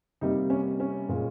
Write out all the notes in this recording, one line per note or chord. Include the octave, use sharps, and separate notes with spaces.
C3 G3 A#3 D#4
C#4
C#4
A#2 G#3